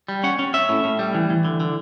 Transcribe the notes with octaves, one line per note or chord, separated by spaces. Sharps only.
G3
C#4 F#5
C#4
C#4 E5
A2
A2
G3
E3
E3
D3
D3